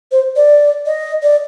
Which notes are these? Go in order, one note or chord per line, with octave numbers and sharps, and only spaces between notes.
C5
D5
D#5
D5